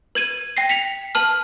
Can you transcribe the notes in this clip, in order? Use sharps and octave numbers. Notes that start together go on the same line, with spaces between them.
B4 G#6 D#7
G5 A#6 C7
B6 C#7 F7
B4 A5 F6